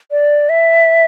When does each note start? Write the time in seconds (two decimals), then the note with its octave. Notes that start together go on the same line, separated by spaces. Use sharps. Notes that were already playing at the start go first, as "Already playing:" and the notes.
0.11 D5
0.49 E5